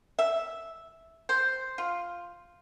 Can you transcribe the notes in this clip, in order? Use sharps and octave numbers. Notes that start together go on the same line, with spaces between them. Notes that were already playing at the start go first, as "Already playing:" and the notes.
E5
C5
F4